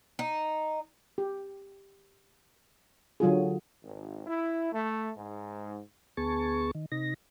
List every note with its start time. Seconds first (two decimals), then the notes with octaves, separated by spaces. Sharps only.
0.19 D#4
1.18 G4
3.20 D3 F#3 F4 G#4
3.83 G#1
4.25 E4
4.72 A3
5.15 G#2
6.17 D2 B3 G#4 A5 C#6
6.75 D#3
6.92 C3 D#4 A#6